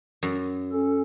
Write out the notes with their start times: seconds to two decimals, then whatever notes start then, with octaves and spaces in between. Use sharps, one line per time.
0.23 F#2
0.72 C#4 A4